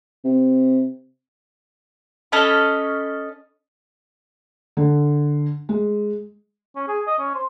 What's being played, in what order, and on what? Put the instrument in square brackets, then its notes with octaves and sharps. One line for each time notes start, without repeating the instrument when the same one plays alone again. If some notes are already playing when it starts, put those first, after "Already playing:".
[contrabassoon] C3
[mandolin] C#4 A4 D#5 B5
[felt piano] D3
G#3
[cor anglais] C#4
G#4
D#5
C#4
C5